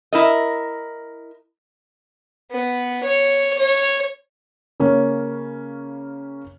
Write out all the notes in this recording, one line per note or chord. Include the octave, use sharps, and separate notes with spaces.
E4 A#4 D#5
B3
C#5
C#5
C#3 A#3 C#4